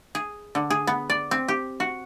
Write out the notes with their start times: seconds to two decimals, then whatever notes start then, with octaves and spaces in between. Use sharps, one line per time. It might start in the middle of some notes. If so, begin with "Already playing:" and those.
0.15 G#4
0.55 D3
0.70 G#4
0.87 B3
1.10 D5
1.31 C4
1.48 G4
1.80 F#4